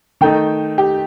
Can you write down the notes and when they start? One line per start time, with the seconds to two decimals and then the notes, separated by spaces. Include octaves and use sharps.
0.21 D#3 A3 D#4 G5
0.78 G4